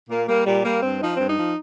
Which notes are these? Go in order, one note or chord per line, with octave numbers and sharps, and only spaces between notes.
A#2 A#3
G3 A#3
A#2 G3
G3 A#3
G2 C4
F3 D#4
C4
G2
D#4
F3